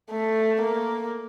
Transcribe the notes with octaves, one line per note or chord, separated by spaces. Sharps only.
A3
A#3